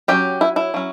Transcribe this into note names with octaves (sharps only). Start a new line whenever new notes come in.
F#3 C#4 G4
E4
E4
F#3 C#4